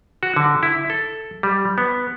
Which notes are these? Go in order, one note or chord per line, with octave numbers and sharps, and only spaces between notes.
F#4
D3
E4
A4
G3
B3